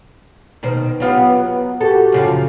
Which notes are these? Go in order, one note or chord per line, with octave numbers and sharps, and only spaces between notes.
B2 D#3 C5
F#3 B3 F4 G4
B3
F#4 G4 A4
F#2 C#3 F3